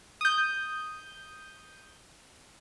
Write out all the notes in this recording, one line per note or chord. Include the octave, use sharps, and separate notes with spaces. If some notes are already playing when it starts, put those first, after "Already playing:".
D#6 G6